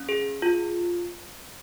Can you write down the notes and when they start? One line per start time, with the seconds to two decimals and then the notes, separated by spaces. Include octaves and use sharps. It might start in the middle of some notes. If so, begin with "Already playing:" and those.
Already playing: C#4
0.09 G#4
0.42 F4